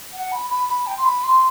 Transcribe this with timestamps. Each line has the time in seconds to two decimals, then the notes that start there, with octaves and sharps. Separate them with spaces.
0.13 F#5
0.31 B5
0.49 B5
0.68 B5
0.86 G5
0.97 C6
1.04 B5
1.23 C6